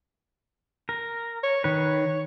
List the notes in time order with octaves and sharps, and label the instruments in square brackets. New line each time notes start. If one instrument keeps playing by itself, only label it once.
[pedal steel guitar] A#4
[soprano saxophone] C#5
[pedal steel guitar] D#3 B4 [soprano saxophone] C#5